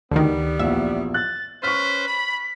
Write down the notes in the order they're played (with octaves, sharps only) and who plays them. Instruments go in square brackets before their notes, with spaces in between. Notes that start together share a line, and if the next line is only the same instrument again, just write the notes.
[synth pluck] D2 D#3 [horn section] G3 B3
[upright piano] A#1 E2 [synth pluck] E5
[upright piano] F#6 [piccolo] A6
[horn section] C#4 B4 C5 [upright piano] C#6 F6 [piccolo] B6
[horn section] B5